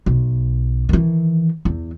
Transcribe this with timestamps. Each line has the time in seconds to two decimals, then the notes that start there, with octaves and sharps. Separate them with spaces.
0.06 B1
0.89 D#3 E3
1.65 E2